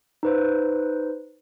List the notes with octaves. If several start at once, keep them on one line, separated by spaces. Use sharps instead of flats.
D#4 B4 C5